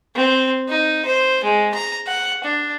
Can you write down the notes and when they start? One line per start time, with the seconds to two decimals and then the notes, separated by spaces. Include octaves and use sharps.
0.16 C4
0.69 D#4
1.06 C5
1.44 G#3
1.74 A#5
2.07 F#5
2.44 D4